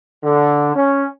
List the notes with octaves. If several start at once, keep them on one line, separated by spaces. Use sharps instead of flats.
D3
C#4